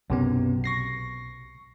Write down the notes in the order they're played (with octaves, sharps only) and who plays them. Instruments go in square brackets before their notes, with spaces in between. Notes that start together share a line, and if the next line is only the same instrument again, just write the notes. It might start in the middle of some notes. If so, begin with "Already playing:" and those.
[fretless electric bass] B1 [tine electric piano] F#2 C3 B3
[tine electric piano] C#6 A#6 C7